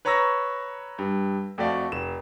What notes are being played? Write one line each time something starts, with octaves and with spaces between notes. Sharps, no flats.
B4 C#5 A#5 C#6 E6 A#6
G2
F2 A3 F#4 D5 F5
F1 E7